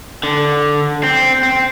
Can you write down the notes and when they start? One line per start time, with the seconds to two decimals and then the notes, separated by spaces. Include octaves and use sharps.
0.23 D3
1.03 C4
1.43 C4